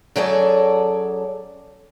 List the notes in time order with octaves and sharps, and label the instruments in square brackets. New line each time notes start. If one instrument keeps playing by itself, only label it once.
[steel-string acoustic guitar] F#2 F#3 G#4 A4 D5